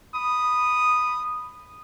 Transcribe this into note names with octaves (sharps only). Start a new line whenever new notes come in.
B5 D#6